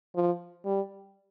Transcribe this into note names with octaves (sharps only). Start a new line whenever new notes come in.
F3
G3